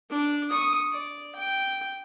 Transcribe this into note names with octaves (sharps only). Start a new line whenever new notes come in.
D4
C#6 D#6
D5
G5